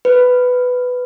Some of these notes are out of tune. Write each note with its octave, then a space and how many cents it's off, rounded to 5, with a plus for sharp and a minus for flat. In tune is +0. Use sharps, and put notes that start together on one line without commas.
B4 +10